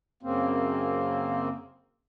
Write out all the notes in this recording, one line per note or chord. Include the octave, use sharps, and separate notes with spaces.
F#2 C#3 A#3 C4